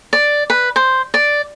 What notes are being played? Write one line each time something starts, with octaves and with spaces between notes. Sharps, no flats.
D5
B4
C5
D5